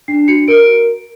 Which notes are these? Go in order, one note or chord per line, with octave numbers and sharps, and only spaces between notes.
D4 C7
F#4 C#7
A#4 D7